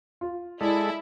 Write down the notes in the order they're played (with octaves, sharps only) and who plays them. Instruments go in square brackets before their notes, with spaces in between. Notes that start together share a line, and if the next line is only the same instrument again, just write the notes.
[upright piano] F4
[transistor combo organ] G#3 A4 [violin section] E4 [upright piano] D5